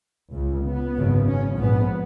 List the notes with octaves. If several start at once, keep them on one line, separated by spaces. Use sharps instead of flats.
C#2 C#3
B3
G#1 F#2 C#3
C#4
A#1 G#2 B3